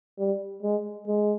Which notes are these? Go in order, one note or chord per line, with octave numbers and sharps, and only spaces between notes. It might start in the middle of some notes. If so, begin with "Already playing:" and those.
G3
G#3
G#3